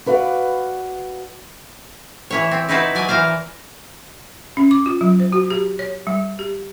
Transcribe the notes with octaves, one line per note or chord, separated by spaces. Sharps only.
F#4 B4 D5 F5
E3 E4 C#5
C4
D#4 E4 F#4 B4 C5 D5
F#3 D5 G#5
E3 A#4 C5 F5
C#4
D6
F4
F#3
C5
F#4
G4
C#5
G3
G4